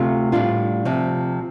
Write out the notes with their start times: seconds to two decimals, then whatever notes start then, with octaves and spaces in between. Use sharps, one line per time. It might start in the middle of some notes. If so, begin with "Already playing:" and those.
Already playing: D2 C3 A3 F4
0.32 A2 G3 D4 F4
0.85 D2 C3 F3